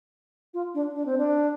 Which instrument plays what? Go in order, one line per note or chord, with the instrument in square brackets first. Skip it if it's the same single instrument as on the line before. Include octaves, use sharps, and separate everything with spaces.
[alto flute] F4
D4
D4
C4
D4